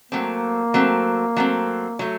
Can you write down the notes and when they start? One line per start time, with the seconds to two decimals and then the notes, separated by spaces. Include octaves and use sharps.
0.12 F#3 A3 A#3 C4
0.74 F#3 A3 C4
1.37 F#3 A3 C4
1.99 F#3 A3